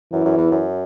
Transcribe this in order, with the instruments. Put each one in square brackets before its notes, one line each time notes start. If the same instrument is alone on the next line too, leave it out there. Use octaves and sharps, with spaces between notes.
[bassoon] F#2 [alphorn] E3
[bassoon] F#2
E2
F#2